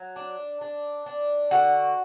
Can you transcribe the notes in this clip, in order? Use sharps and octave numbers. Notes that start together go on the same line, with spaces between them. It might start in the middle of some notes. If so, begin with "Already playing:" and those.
Already playing: F#3
D4
D4
D4
D3 F#4